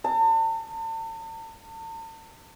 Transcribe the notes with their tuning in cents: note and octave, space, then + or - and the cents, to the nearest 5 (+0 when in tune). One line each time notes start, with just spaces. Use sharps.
A5 +40